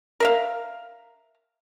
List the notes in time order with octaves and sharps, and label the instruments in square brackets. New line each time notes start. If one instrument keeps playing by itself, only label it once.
[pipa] A#4 E5 F5